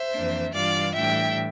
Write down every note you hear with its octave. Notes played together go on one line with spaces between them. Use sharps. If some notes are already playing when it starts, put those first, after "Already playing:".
Already playing: C5 E5
F2 E3 A#3 D4
G2 E3 G3 D4 F4 D5 F5
A2 E3 G3 D4 E5 G5